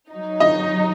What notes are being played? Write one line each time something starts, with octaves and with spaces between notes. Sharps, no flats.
F#3 D#4
D#5